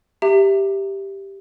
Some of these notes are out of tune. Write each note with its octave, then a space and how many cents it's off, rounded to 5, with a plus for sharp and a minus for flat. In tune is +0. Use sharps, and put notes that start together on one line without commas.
G4 +0 E5 +0 A#5 -25